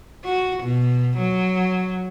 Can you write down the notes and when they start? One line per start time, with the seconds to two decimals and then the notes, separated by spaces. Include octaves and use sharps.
0.25 F#4
0.63 B2
1.18 F#3